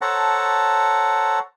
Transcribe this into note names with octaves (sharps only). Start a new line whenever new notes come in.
A4 C5 C#5 F#5 A5 A#5